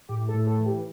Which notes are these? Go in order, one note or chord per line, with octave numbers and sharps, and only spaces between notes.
A2 G4
A4
A2
A4
E3
G4